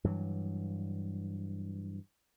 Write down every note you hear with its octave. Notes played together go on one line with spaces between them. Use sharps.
G2 E3 F#3